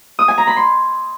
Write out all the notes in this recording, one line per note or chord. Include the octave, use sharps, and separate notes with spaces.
D#6
G#5
A#5
B5
C6